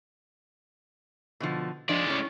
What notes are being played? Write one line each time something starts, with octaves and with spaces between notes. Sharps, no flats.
B2 D3 F3
F3 G#3 D4 D5 D#5
A2 C#4